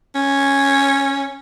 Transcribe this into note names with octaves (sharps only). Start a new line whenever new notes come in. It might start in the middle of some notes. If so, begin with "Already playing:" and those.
C#4